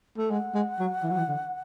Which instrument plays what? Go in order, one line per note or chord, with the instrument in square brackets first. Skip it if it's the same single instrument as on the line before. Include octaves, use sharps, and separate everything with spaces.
[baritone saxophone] A3
[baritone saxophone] G#3 [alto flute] F#5
[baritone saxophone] G#3
F#3
E3
F#3
E3
D3